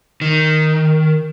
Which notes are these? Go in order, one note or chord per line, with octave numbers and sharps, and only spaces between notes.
D#3